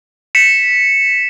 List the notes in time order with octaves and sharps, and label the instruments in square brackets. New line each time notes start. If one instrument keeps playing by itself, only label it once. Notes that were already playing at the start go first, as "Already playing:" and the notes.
[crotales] B6 C#7 E7